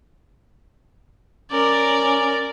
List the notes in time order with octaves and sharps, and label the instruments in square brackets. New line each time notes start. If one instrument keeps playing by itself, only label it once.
[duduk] C#4 [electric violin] A#4 D5